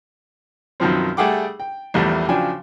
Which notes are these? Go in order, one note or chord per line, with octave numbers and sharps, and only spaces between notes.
F#2 B2 D#3 F3 C4
G3 A3 G#4 F#5 G5 D6
G5
A#1 E2 G3 A3
C#3 F3 F#3 D4 G5 G#5